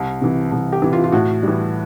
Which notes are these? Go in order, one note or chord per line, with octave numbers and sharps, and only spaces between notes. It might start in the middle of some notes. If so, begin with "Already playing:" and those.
Already playing: C2
C3 E3
C2
G4
C3 E3
F4
F4
A2 F#4
E3 G3